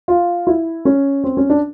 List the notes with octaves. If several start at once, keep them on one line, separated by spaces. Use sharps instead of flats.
F4
E4
C#4
C4
C#4
D4